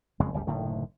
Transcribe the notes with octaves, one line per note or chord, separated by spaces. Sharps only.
F#1 F2 C#3 G#3
F#1 C#2 G3
F#1 A2 D3 D#3